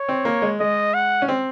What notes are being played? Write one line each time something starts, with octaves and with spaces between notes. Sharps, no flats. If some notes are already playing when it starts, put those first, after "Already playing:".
Already playing: C#5
C4
A#3
G#3
G#3 D#5
F#5
C#4
C4